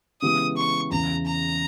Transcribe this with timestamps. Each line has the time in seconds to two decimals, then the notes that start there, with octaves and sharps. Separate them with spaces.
0.22 C#3 E3 G#3 B3 G4 D#6
0.57 C#6
0.91 E2 C#3 E3 A#5
1.25 A#5